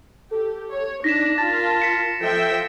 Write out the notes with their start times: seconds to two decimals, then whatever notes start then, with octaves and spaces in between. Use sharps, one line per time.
0.31 G4 A4
0.71 C#5
1.04 D4 D#4 A#6 B6 E7
1.38 F4 A#4 A5 A6
1.80 B6 C#7 E7
2.21 F3 A4 E5 G5